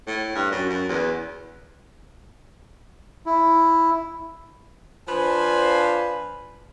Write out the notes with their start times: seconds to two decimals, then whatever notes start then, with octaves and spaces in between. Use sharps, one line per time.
0.07 A2
0.35 G2
0.52 F#2
0.69 F#2
0.89 E2
3.26 E4
5.08 F3 D4 B4 C5 F5 G#5